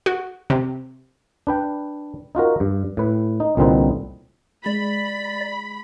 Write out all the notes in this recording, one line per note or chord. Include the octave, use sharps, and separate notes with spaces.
F#4
C3
D4 B4 G5
D#4 F4 F#4 A#4
G2
A2 B4
D#4
C2 A#2 D3 C4 D#4 B4
G#3 D5 B5